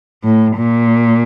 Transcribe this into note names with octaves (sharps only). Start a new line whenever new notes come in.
A2
A#2